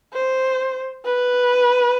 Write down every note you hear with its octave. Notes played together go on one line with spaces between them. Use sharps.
C5
B4